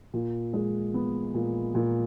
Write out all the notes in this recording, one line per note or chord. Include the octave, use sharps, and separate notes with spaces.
A#2
G#3
B3
A#2
A#2